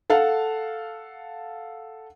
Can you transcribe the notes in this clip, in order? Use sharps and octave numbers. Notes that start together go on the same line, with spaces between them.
A4 F5 F#5 A5